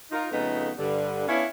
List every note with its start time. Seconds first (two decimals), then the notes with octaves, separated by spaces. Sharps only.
0.11 D#4 F4 A#4
0.31 F2 C#3 A3 B3 D#4
0.77 G2 D3
1.28 B3 C#4 D4 E4 C#5 F5